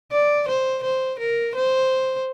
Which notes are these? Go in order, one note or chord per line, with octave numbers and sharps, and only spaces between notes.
D5
C5
C5
A#4
C5